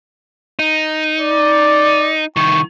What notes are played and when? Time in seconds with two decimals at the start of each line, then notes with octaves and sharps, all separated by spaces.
0.59 D#4
1.20 D5
2.37 C2 D#3 C#6